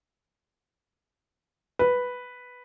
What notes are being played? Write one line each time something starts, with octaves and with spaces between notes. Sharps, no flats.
B4